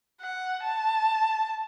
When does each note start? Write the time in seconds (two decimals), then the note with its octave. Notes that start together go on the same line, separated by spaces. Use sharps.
0.21 F#5
0.64 A5